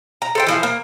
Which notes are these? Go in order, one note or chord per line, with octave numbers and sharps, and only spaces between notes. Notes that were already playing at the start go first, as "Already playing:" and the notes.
A#5
A4 C5 G5
E3 F3 F5
A#3